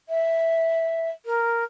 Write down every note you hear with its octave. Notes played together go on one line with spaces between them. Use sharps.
E5
A#4